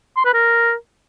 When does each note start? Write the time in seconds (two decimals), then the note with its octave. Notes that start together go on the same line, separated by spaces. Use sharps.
0.17 C6
0.25 B4
0.34 A#4